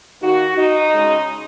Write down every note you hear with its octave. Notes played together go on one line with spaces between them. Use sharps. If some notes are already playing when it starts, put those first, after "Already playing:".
D#3 A#3 D#4 F#4
D#4
C#3 G#3 C#4